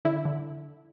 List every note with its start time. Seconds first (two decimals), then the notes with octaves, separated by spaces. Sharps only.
0.05 D3 E4
0.25 D3